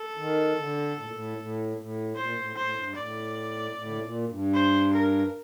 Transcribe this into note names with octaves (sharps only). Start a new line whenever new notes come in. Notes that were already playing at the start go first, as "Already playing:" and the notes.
Already playing: A4
D#3
D3
A2
A#2
A2
A2
A2
A#2 C5
A2
A2 C5
G2
A2 D5
A2
D3
C3
A#2
G2
C5
A#4